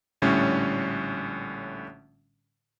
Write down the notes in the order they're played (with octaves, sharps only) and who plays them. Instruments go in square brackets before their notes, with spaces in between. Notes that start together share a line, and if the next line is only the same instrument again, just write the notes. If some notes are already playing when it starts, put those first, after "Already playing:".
[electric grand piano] A#1 A2 D3 G3 C#4 C#5